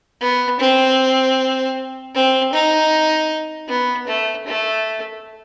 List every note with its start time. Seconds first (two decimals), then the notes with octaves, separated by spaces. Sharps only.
0.21 B3
0.60 C4
2.15 C4
2.53 D#4
3.68 B3
4.08 A3
4.46 A3